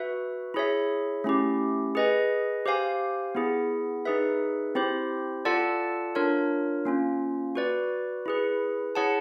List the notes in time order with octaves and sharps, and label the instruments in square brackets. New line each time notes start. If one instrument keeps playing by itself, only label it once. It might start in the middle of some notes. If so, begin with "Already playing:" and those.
Already playing: [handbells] F#4 B4 E5
E4 G#4 C#5 E5
A3 C#4 E4 G4
G#4 B4 D#5 G#5
G4 C5 F5 G#5
B3 E4 G#4
D#4 G#4 B4 E5
C4 E4 G4 C5
F4 A4 D5 F#5 A5
D4 F4 A#4 C#5
A#3 C#4 F4
F#4 B4 D5
E4 G#4 B4
E4 G#4 C#5 F#5 A5